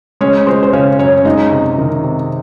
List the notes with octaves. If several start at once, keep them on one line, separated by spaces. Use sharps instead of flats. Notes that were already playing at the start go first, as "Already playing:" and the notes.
G#3 C#4 C#5
G#3 C5
C5
C#3 C#4 C#5
F#2 C#4 C#5
G#3 D#4 D#5
C3
D#3
C3